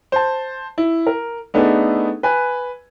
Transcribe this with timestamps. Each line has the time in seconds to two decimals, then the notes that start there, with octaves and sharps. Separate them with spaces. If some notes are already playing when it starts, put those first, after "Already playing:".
0.12 C5 A5
0.78 E4
1.07 A#4
1.54 A3 B3 D4 D#4 G#4 A4
2.23 B4 G#5